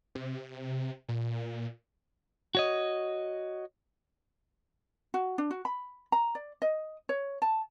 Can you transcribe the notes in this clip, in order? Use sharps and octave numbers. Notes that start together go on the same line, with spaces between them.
C3
A#2
F#4 C#5 D#5
F#4
D4
F#4
B5
A#5
D5
D#5
C#5
A5